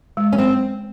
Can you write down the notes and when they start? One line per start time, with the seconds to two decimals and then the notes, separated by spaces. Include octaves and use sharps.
0.17 G#3
0.32 C#4
0.38 C4